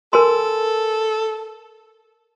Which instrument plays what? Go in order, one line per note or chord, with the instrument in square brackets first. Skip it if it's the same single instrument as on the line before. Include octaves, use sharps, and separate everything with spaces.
[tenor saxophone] A4 [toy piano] A#4 G#5 C6